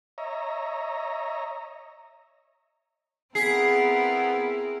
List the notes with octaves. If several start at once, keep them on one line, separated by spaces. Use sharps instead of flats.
C#5 D#5 E5 A#5
B3 C4 E4 G#4 A#4 B6 C7